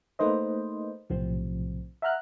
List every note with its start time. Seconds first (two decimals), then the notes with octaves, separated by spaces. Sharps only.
0.19 A3 A#3 D#4 B4 C5 D#5
1.10 B1 A2 C3 F3 C4
2.02 E5 F#5 A#5 F6 F#6